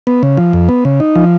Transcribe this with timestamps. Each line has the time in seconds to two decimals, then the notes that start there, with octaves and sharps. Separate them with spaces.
0.07 B3
0.23 C#3
0.37 F3
0.53 F2
0.69 B3
0.85 C#3
1.00 D#4
1.16 F3